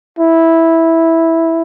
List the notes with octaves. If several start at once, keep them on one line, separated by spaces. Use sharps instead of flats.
E4